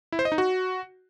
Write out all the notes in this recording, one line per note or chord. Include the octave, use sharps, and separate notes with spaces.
E4
C5
D#5
D#4
F#4